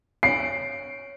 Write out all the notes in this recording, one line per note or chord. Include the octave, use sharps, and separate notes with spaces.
C#5 C7 D7